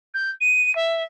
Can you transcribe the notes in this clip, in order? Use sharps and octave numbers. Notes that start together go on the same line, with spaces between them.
G6
D#7
E5